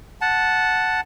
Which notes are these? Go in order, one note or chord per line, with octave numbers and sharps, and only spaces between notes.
F#5 A5